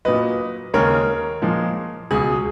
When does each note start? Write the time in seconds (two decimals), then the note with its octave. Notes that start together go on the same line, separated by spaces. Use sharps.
0.05 A#2 F#3 B4 D#5
0.74 D#2 C#3 G#3 A#4 C#5
1.42 A#2 F3 G#3
2.11 C#2 B2 F#3 G#4